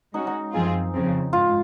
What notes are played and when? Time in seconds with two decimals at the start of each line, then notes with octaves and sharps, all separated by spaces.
0.14 G#3 C#4 D#4 F#4
0.27 D#4
0.53 F#2 F3 C4 F4 G#4
0.93 F2 C#3 F3 C4
1.33 G#2 F4